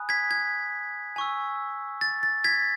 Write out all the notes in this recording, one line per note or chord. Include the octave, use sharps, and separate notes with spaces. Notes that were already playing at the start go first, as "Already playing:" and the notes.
Already playing: G#5 B5 D#6 F#6
G#6 B6
G#6
G#5 C#6 E6
A6
A6
G#6 B6